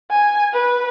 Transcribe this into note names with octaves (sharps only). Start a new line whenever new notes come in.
G#5
B4